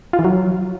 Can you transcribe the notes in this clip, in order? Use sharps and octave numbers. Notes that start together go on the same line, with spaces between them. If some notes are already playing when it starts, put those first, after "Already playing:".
F4
E3
F#3